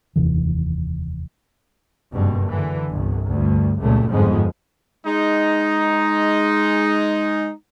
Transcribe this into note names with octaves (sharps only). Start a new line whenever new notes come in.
F1 D#2 C3 E3
F#1 G2 B2
D3 E3
G1 C2
D2 G2
C#2 F#2 A#2 A3
G1 F2 G#2 F3 G#3 B3
G#3 D#4